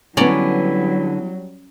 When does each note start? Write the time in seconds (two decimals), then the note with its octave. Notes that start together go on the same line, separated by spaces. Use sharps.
0.17 D3 F#3 G3 B3 C#4 E4 D5 A#5